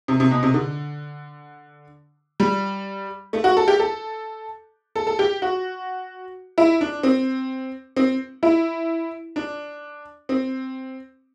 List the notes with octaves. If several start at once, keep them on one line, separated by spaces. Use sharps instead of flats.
C3
C3
B2
C3
D3
G3
A3
F#4
A4
G4
A4
A4
A4
G4
F#4
E4
D4
C4
C4
E4
D4
C4